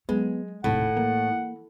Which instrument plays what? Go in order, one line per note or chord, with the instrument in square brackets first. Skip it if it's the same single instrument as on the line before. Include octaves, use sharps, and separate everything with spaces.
[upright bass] F#3 [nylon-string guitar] G#3 [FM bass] B3
[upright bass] D#1 D#4 [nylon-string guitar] A2 [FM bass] C3 [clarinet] F#5
[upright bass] E3 [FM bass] A#3